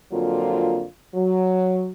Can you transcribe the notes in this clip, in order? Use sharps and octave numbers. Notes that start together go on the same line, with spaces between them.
F2 D3 F#3 A#3 F4
F#3